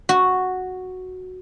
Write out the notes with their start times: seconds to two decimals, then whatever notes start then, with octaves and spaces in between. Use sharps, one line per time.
0.09 F#4